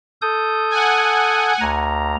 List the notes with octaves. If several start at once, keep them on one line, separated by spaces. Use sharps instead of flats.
A4 D#6 G6
F#5 G#5
D2 A#5